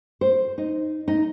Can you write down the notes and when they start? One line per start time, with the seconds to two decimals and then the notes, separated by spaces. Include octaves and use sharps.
0.21 C5
0.58 D#4
1.08 D#4